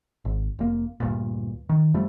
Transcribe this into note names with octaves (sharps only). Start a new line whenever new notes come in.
G#1
F1 A#3
D2 G2 A#2
D#3
F#2 F3 G3 A3